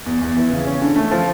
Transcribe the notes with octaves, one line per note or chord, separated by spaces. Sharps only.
E2
E2
E3
C#3
C#4
D3
A3
F3